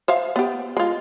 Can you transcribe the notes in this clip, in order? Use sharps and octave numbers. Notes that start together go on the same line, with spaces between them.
C5 E5 F5
B3 G4
G#3 F4